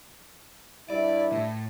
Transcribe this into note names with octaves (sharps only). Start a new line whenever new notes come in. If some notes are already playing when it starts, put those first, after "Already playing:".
G2 G3 E4 D5
A2